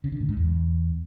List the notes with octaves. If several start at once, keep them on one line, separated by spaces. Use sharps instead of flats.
C#3
D3
A2
G#2
E2